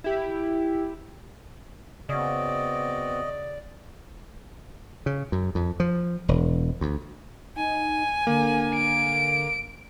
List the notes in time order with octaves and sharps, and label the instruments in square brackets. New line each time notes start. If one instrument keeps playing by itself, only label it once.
[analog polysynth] E4 G4
[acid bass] C#3 [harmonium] B3 C4 F#4 [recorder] D5 [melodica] D#5
[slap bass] C#3
F#2
F2
F3
E1
D2
[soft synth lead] D#4 [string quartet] G#5
[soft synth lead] D3 [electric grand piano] A#3
[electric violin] D7